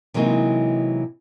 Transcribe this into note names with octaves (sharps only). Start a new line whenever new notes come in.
C3 E3 F#3 G#3 A#3 D#4